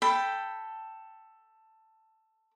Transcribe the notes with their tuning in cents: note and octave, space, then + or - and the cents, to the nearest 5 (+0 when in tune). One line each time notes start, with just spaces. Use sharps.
A4 +5 G5 +0 B5 +0